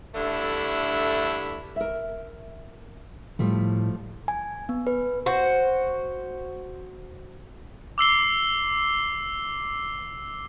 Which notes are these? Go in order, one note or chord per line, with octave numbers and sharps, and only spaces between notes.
G2 D3 A3 E4
A#4 E5
A2 F3 G3 A3
G#5
B3
B4
F#4 C5
D6 E6 C7 G7